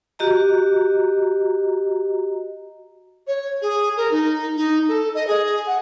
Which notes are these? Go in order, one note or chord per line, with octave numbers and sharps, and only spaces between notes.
F#4 G4 D#5 A#5
C#5
G#4
A#4
D#4
D#4
A4
D#5
G#4
F#5